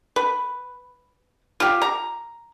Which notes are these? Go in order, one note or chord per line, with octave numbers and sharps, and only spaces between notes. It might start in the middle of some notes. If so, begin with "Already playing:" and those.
B4
F4 G4
A#5